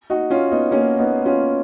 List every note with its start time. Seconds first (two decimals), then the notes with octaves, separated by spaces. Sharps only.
0.10 D#4 F#4
0.30 C#4 F4
0.51 B3 D#4
0.71 A#3 C#4
0.99 B3 D#4
1.25 C#4 F4